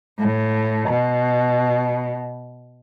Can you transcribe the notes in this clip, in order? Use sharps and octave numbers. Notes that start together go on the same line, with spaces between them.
A2
B2